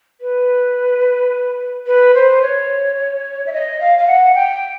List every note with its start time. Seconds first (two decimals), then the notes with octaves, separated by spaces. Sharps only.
0.21 B4
1.87 B4
2.15 C5
2.42 C#5
3.46 E5
3.53 D#5
3.80 F5
3.99 F5
4.07 F#5
4.35 G5